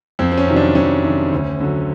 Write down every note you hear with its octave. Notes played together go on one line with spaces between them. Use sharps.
F2 C4
C4
C#4
C3 D#3 F#3
D4
F2 C#4
C3 D#3 F#3
D2
D3 F#3